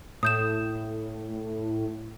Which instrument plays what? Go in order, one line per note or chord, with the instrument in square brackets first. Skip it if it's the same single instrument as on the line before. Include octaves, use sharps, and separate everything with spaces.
[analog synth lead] A2 [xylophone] D#6 G6 E7